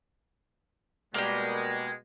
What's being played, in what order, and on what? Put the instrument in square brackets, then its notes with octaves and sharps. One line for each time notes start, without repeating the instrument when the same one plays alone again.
[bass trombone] B2 [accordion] G3 [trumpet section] G#3 [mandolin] A#3 G4